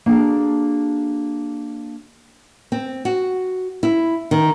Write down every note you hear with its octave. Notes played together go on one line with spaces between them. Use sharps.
A#3 D4 F#4 G#4 A4
C4
F#4
E4
D#3